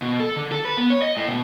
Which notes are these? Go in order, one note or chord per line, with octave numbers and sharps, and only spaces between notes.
B2
A4
D3
A4
B4
B3
C#5
D#5
A2
B2